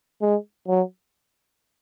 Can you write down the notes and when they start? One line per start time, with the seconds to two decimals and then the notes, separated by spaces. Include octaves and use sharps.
0.22 G#3
0.68 F#3